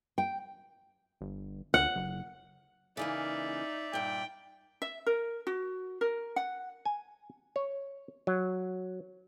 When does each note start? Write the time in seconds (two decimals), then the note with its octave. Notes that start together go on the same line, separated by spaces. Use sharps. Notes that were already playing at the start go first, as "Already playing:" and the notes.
0.18 G5
1.21 G1
1.74 D2 F#5
1.96 F#1
2.97 C#3 E3 A#3 D#4 D5 E5
3.93 G2 A#2 G5
4.82 E5
5.07 A#4
5.47 F#4
6.01 A#4
6.36 F#5
6.85 G#5
7.56 C#5
8.27 F#3